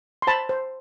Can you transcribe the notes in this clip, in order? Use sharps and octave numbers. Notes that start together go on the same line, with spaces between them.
C6
C5 A5 B5
C5